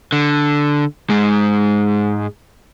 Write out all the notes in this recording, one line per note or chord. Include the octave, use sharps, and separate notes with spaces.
D3
G#2 G#3